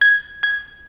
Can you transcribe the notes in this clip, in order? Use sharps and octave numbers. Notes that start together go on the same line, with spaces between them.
G#6
G#6